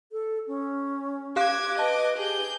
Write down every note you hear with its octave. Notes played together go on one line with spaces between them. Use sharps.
A4
C#4
G4 F5 D6 F#6 G#6
B4 D#5 A5 D6
G4 G#4 G6